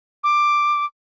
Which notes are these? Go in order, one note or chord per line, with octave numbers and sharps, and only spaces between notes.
D6